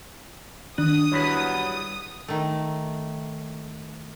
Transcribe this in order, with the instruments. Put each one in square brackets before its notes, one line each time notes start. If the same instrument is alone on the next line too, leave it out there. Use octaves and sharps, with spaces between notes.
[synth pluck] D#3 D4 F#6 [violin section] D#6
[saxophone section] E2 F#3 [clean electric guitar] G3 E4 B5
[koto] D#3 A3